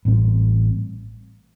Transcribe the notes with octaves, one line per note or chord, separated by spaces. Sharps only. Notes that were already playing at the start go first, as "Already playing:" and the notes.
A1 A2 G3 C4